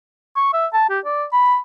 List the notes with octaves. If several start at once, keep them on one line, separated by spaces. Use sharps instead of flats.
C#6
E5
A5
G4
D5
B5